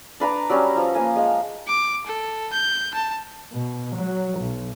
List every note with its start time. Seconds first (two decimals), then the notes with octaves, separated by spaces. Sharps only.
0.20 D4 B4 A#5 D6
0.50 F#3 G3 C#4
0.76 F3
0.94 A#3 F5 G#5
1.16 G#3 F5
1.68 D6
2.06 A4
2.53 G6
2.94 A5
3.53 B2
3.95 F#3
4.40 B1